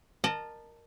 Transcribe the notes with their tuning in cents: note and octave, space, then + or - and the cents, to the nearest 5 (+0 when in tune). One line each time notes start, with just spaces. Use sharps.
A#4 +0 D#5 -30 A5 +0